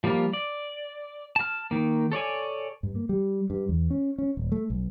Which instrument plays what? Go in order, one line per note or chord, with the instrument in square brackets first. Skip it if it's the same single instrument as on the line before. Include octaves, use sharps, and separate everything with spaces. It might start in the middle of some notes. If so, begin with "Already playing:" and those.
[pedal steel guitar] F3 G3 A#3 F4
D5
A5 F6
D#3 A#3
A4 C#5 D5 G#5
[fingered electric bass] G2
A#3
G3
G2
E2
C#4
C#4
D#1
A3
B1